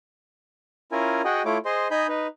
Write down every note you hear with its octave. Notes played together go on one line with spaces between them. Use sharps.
C#4 E4 F4 A#4 G#5
F#4 G#4 D#5 F#5 G5
A3 E4 F4 C#5 D6
G#4 C5 D#5 C6
D#4 D#5 G#5 B5 G6
D#4 B4